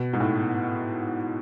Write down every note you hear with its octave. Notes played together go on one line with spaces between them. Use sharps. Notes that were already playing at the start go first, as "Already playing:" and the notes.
Already playing: B2
G#2
A2